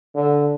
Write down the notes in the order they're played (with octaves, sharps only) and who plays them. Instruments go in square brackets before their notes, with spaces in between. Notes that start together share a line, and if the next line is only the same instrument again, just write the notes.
[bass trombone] D3